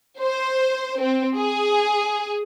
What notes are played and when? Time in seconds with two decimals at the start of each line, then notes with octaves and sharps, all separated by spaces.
0.19 C5
1.00 C4
1.36 G#4